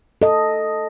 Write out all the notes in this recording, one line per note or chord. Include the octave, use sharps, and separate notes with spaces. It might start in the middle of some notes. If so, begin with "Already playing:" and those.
A4 D#5